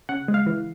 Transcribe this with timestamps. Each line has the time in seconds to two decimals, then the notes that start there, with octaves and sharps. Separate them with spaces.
0.09 C#3 F#5
0.28 G#3
0.34 F5
0.46 E3